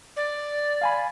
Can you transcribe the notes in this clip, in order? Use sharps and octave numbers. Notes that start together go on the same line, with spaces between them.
D5
F5 G#5 B5